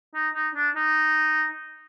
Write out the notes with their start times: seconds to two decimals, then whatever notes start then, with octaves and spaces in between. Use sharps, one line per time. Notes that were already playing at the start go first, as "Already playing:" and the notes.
0.15 D#4
0.34 D#4
0.55 D4
0.76 D#4